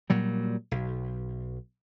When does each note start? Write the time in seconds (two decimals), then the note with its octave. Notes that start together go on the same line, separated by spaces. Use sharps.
0.10 A#2 F#3 G3
0.71 B1